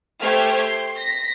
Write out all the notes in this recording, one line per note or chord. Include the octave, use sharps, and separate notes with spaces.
A3 G4 C5 F6 G#6
C6
A#6 B6